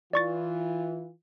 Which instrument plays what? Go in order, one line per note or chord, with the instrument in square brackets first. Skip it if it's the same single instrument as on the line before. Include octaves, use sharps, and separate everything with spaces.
[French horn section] E3 F4 [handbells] D5 C#6 A6